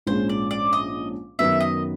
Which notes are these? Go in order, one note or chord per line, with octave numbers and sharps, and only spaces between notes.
A#1 G#2 F3 G#3 C#4 C5
D5
D5
D#5
F#2 D#3 F#3 B3 E5
D#5